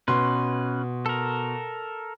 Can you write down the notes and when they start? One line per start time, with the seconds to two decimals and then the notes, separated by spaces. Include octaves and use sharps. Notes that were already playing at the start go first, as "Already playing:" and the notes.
0.08 B2 C#4 B4 C6
1.06 A4 A#4